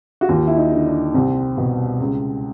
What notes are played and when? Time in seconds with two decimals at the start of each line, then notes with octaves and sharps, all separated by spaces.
0.21 F#4
0.29 D#2 F4
0.47 E4
0.57 D#4
0.72 D3
0.86 D4
1.14 C2 C4
1.57 B2
2.00 C#2